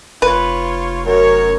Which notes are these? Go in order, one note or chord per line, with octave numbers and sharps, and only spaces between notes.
F1 F4 B4 C#5
F#2 A#4 C#5